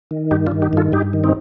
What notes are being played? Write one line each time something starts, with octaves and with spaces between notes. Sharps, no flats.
D#3
G2 D#4 G4
D4 F4
D#3
D#4 G4
G2 F4 A4
G2 D#4 G4
D#3
C4 D#4